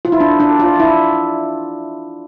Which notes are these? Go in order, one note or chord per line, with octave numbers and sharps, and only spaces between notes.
F4
E4
D4
D4
F4
E4